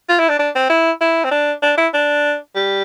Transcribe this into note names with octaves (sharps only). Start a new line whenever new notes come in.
F4
E4
D4
D4
C4
E4
E4
C4
D4
D4
E4
D4
G3